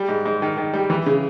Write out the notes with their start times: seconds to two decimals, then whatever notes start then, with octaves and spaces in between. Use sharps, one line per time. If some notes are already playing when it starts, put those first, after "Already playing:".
Already playing: G3
0.09 G#2
0.26 G#2
0.42 D#3
0.57 D#3
0.73 G3
0.90 E3
1.06 C#3